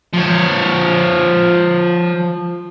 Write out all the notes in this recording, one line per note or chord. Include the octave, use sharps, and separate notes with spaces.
F3 C#5